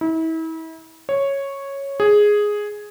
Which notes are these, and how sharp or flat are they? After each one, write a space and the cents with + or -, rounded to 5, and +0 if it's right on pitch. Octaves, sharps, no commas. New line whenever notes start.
E4 -35
C#5 -5
G#4 +0